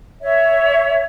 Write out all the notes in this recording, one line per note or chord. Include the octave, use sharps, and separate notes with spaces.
C#5 E5